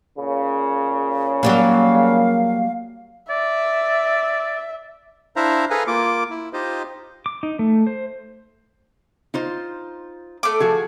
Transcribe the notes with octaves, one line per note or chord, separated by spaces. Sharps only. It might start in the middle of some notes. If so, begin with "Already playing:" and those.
A#2 C#3
F#3 G3 A#3 F5
D5 E5
D4 E4 C5 E5 F5 A#5
G#4 A4 B4 F5 G#5 A#5
A#3 F4 D6
E4
D#4 F4 G4 C5 D#5
D6
D#4
A3
C5
D#4 F4 C5
A3 D6
F3 F#4 G#4